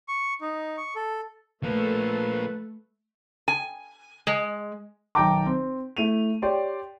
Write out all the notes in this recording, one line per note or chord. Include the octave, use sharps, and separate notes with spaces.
C#6
D#4
C#6
A4
F3 A3 A#3 A4 B4
G#5
G#3
B1 D#3 G5 A5 A#5 D6
C4
A3 E4 D#7 F7
G4 C#5 D5 G5 C6